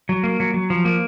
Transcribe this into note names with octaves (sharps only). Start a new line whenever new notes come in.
F#3
A#3
F#3
F#3
F3
A#3